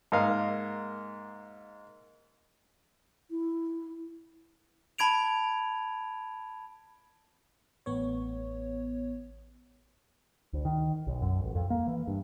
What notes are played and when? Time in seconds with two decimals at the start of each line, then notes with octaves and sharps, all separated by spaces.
0.12 G#2 A#3 D#5 F5
3.31 E4
4.98 A5 B5 G#6 D7 F7
7.86 A1 B3 C#5
10.53 D2
10.65 D#3
11.07 B1
11.22 F#2
11.42 A1
11.55 F2
11.70 A#3
11.87 E3
12.08 G2